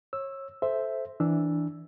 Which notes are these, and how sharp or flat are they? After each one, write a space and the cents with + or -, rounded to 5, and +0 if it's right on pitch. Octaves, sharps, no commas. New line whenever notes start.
C#5 -30 E6 +0
A4 -15 C5 +0 E5 +0
E3 -10 D4 +0 E6 +0